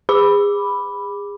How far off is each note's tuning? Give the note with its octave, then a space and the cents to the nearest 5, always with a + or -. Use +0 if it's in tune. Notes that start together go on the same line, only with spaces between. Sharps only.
G#4 -30 B5 +0 D6 +0